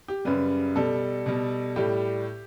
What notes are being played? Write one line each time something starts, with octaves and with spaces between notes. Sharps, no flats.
G4
F#2 C#3 G3 B4
B2 G3 A4
B2 G3
A2 G3 G4